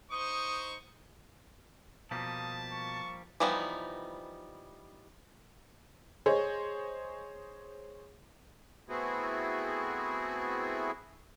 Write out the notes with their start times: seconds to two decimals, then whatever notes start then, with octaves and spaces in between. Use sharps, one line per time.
0.12 D#4 C5 C#6 D#6
2.11 B2 F3 G3 A#3 A5 D#6
2.72 C#6
3.40 E3 F3 G3 B3 D#4
6.26 G#4 C5 C#5 D#5
8.89 A3 B3 C4 E4 F#4 G#4